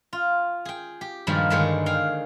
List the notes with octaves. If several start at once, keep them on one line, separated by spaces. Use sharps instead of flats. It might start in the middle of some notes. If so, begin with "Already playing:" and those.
F4
G#4 G5
G4
G2 A#2 D#3 F3 G3 G#3
G2 D3 D#3 G#3 G#4 C#5
G#4 F5 G5